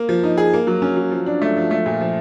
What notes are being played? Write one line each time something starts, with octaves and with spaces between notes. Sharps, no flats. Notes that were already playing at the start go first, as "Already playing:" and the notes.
Already playing: A#3
F3
D#4
G#4
A#3
F#3
C#4
F#3
F3
D4
A3
F3
A3
A#2
F3